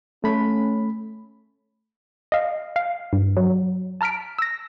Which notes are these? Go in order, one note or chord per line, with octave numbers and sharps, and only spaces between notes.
A3 C#4 B5
D#5 F5
F5
G2
F#3
A5 A#5 F6 B6 D7
E6 A#6